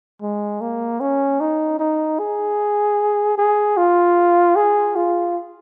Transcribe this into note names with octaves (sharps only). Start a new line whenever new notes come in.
G#3
A#3
C#4
D#4
D#4
G#4
G#4
F4
G#4
F4